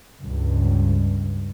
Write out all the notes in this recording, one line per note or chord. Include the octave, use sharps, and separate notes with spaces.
C#2 G2